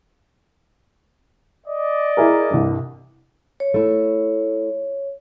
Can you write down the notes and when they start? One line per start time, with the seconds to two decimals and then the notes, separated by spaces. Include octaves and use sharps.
1.66 D5 D#5
2.17 E4 G#4 A#4
2.50 C2 G2
3.60 C#5
3.74 A3 E4